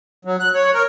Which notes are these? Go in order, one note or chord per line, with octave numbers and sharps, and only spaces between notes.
F#3
F#6
C#5
A#4